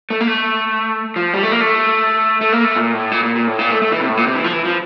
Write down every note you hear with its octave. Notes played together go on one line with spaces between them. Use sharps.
A3
A#3
A3
F3
G3
A3
A#3
A3
A3
A#3
A3
A#2
A2
A#2
A#2
A#2
A2
A#2
A3
A3
E3
C3
A2
A#2
C3
E3
F3
E3
F3